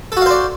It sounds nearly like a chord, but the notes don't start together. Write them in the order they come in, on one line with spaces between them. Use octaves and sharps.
A4 F#4 F5 C5 D5